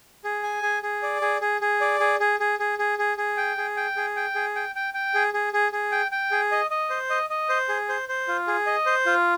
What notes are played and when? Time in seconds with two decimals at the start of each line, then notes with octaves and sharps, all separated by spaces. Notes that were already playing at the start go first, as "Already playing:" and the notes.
0.24 G#4
0.43 G#5
0.63 G#4
0.83 G#4
1.03 D5
1.21 G#4
1.41 G#4
1.61 G#4
1.81 D5
2.00 G#4
2.20 G#4
2.40 G#4
2.59 G#4
2.79 G#4
2.99 G#4
3.18 G#4
3.37 G5
3.57 G#4
3.77 G5
3.96 G#4
4.16 G5
4.35 G#4
4.56 G5
4.75 G5
4.94 G5
5.14 G#4
5.34 G#4
5.53 G#4
5.72 G#4
5.92 G5
6.11 G5
6.31 G#4
6.52 D#5
6.71 D#5
6.90 C5
7.10 D#5
7.30 D#5
7.49 C5
7.69 G#4
7.89 C5
8.09 C5
8.28 F4
8.47 G#4
8.67 D#5
8.86 C5
9.06 F4